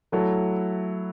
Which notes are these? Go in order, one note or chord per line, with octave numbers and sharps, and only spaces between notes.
F#3 A3 E4 A4